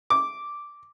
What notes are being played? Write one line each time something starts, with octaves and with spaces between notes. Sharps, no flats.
D6